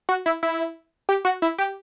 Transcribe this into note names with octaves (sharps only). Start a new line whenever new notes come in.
F#4
E4
E4
G4
F#4
E4
G4